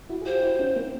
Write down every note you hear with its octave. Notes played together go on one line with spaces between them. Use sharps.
E4 F#4
G#4
F4 G4 C5
E4 F#4
C#4 D#4
A#3 C4